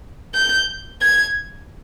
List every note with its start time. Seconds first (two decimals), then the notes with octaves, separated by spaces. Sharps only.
0.35 G6
1.01 G#6